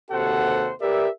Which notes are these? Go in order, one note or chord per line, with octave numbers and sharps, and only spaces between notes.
D#2 C3 F#4 A4 C5 F#5
G4 A#4 B4 D5 E5